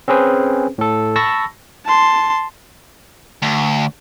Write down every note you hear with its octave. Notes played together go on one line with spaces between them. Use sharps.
C4 C#4 G#4 B4 C5
A2 A4
A5 B5 C#6 E6 A#6
A5 C6
D2